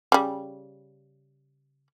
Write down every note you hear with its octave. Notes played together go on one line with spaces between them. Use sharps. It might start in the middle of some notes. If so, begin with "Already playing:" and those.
C#3 G3